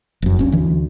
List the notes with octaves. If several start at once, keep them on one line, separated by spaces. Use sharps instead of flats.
F1 F#2
D#1 G2 C#4
D2 E3